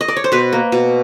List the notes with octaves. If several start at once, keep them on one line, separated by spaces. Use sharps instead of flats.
D#5
D5
C#5
C5
B2 B4
A#3
B2